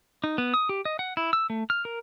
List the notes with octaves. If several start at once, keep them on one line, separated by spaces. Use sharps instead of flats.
D#4
B3
D#6
G4
D#5
F#5
E4
E6
A3
F6
A#4